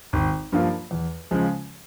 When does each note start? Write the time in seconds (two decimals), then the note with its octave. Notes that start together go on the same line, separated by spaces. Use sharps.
0.13 G#1
0.52 G2 F3 A#3 F4
0.91 E2
1.31 C#3 F3 G#3